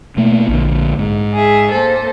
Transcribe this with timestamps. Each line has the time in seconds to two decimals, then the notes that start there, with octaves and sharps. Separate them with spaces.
0.17 B2 A3 A#3
0.48 A#1 A#2 D3
0.99 G#2
1.34 G#4 E5
1.69 A#3 A4 C5